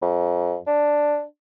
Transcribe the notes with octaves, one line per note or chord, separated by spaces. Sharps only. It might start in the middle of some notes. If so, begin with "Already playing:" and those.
F2
D4